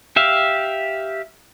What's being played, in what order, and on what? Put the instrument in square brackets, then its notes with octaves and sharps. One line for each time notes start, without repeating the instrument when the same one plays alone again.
[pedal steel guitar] G4 E5 F5